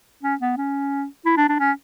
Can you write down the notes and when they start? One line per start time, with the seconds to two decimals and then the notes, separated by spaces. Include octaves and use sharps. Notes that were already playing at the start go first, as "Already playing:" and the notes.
0.23 C#4
0.40 B3
0.57 C#4
1.25 E4
1.37 D4
1.49 D4
1.59 C#4